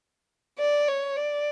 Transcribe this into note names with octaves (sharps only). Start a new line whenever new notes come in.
D5
C#5
D5